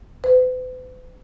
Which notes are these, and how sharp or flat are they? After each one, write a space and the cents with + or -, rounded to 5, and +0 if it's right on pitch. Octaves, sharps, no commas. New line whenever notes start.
B4 +45